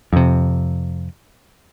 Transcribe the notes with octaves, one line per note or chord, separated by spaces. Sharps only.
F2 C3